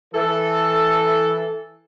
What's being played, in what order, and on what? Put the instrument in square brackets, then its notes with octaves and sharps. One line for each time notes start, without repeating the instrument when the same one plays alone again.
[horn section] E3 A4